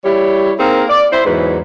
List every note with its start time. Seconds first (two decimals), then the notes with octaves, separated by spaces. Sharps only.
0.04 G3 E4 G4 C#5
0.59 A#3 C4 D#4 G#4 A#4
0.89 D5
1.12 E4 C5
1.25 E2 G#2 F#3 B4